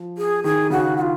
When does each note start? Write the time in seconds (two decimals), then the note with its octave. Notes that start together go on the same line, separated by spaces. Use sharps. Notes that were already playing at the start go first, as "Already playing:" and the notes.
Already playing: F3
0.18 G#4
0.44 D#3 G#4
0.70 C#3 F#4
0.97 F#4
1.01 F4